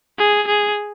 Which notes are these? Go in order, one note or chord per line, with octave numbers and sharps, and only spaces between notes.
G#4
G#4